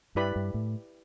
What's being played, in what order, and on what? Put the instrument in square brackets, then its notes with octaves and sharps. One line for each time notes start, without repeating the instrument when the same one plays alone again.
[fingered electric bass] G2 [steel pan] E4 G4 B4 D5 B5
[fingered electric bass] G2
A2